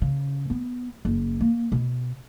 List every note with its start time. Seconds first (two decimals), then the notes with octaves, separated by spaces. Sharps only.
0.02 C#3
0.50 B3
1.05 F#1
1.41 A#3
1.72 B2